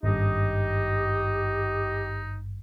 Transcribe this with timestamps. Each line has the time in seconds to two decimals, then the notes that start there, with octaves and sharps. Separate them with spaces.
0.03 G#1 G2 D#4 G4 D#5